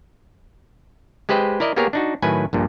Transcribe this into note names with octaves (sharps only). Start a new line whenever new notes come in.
G#3 G4 B4 C5 D#5 G5
E4 A#4 D5 D#5
A#3 B3 G4 G#4 A#4 C#5
D4 D#4 F#4
A2 D#3 F#3 E4 B4 G#5
A#1 G2 A#2